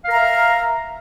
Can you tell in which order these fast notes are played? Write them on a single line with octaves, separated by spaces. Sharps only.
F5 A#4 A#5 E5